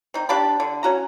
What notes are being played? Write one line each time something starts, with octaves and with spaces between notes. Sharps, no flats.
C4 D#4
D4 G4 A5 B5
D3
C#4 F#4 A#5